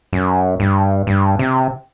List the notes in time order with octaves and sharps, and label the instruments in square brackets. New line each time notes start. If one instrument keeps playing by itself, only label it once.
[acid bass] F#2
G2
G2
C3